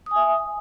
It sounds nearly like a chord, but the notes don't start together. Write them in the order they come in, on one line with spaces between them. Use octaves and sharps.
D#6 G#5 E5